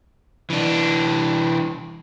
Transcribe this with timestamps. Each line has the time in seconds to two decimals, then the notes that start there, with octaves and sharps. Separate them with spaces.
0.50 E3 D4